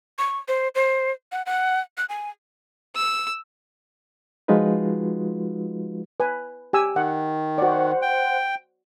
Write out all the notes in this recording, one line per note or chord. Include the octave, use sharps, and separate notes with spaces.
C#6
C5
C5
F#5
F#5
F#6
G#5
E6
F3 G#3 D#4 F4 F#4 B4
B4 G#5
G4 G#5 E6
D#3 F#5
F#4 C5 D5 F#5
G5